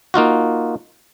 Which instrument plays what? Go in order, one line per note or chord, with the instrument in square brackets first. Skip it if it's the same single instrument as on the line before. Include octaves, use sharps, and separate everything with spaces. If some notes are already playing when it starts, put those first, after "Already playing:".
[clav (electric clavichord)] A#3 D#4 F4 F#4